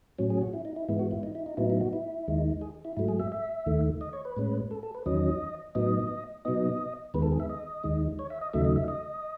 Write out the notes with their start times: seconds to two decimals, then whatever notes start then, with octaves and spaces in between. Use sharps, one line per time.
0.18 A2 F#3 C#4
0.30 G#4
0.41 F#4
0.53 E4
0.65 D#4
0.76 E4
0.89 G#2 E3 G#3 B3 E4
0.99 F#4
1.11 E4
1.23 D#4
1.35 E4
1.46 D#4
1.57 A2 F#3 B3 D#4 E4
1.70 E4
1.81 F#4
1.93 E4
2.28 D#2 D#3 G#3 D#4
2.61 G#4
2.85 E4
2.97 G#2 F#3 A3 E4
3.08 G#4
3.19 E5
3.32 E5
3.66 D#2 D#3 A3
4.01 D#5
4.13 C#5
4.25 B4
4.37 A2 G#3 C#4
4.71 A4
4.83 A4
4.94 B4
5.06 E2 D#3 F#3 C#4 D#5
5.75 A2 F#3 B3 D#4 D#5
6.45 B2 F#3 B3 D#4 D#5
7.14 D#2 D#3 G#3 B3 B4
7.22 A4
7.32 G#4
7.40 E5
7.49 D#5
7.83 D#2 D#3 G#3 D#4
8.19 C#5
8.30 E5
8.41 D#5
8.53 D#2 C#3 F#3 A3 D#4 E5
8.65 D#5
8.76 E5
8.88 D#5